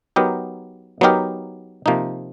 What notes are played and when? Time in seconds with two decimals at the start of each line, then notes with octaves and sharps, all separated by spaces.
0.16 F#3 B3 D#4 G4 A#4
1.01 F#3 B3 D#4 G4 A#4
1.86 C3 F3 A#3 D#4